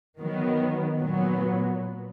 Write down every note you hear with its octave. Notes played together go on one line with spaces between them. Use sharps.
D#3 F#3 B3
A#2 F#3 B3